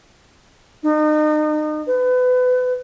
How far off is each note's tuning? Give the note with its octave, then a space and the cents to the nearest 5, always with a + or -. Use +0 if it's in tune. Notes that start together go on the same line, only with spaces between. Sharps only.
D#4 -35
B4 +30